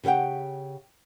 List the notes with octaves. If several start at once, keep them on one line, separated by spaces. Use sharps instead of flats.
C#3 G4 A4 F#5 G5